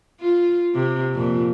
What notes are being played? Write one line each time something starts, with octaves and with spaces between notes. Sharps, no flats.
F4
C3
F2 A#2